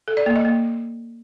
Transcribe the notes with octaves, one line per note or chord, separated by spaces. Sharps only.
A4
D5
A#3
D#5
A#3